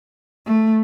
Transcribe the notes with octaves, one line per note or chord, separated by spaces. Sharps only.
A3